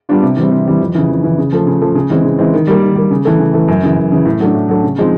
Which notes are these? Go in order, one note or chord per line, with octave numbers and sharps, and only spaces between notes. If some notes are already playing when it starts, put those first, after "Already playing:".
G3 B3 D4 F4
C3
E3 G3 C4
C3
E3 G3 C4
F2
C#3 E3
F2
C#3 E3
C#3
F3 A3
C#3
F3 A3
C#3
E3 G#3 C4
C#3
E3 G#3 C4
D#3
G3 A#3
D#3
G3 A#3
C#3
E3 A3
C#3
E3 A3
F#2
C#3 E3
F#2
C#3 E3
A2
F#3 A3 D4
A2
F#3 A3 D4
C#3
F3 G#3 C4 D#4